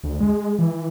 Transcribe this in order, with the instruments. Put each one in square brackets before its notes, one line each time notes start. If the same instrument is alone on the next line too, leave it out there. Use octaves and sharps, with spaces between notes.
[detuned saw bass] D2
G#3
E3